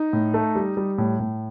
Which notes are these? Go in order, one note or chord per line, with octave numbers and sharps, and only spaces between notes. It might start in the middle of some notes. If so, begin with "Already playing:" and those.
Already playing: D#4
A2
A3
G3
G3
A2
A2